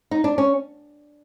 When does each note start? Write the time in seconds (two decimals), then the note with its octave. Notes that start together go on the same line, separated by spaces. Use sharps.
0.11 D#4
0.24 D4
0.38 C#4